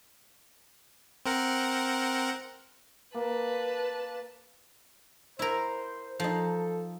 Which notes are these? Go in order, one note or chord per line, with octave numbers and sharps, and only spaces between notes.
C4 A#4 F#5
A#3 B4 A5
E4 A#4 C5
F3 D#4 A4